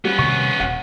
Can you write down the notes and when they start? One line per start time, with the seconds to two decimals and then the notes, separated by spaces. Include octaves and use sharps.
0.05 G3 B3 C#4
0.19 C3 D#3 G3 C#6
0.60 D#1 F#5